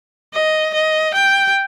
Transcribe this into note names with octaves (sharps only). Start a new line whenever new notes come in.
D#5
D#5
G5